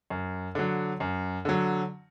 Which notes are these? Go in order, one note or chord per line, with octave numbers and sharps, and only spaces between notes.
F#2
D3 F#3
F#2
D3 F#3